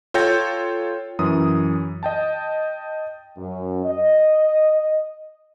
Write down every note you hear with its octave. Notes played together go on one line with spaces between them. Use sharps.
F4 A4 C#5 G5 G6 A#6
F#2 E3 D#6
D#5 G5 A5
F#2
D#5